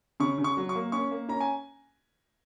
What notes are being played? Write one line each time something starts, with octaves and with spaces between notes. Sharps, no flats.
C#3 C#6
C#3
C#6
F#3
C#6
A#3
C#4 C#6
A#3
C#4 A#5
G#5